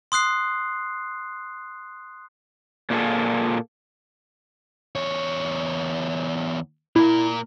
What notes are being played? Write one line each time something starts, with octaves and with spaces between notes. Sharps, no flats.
C6 D#6 F#6 C7
A#2 A#3 C#4 E4 G#4 A4
E2 C#5
A#2 E4 A#4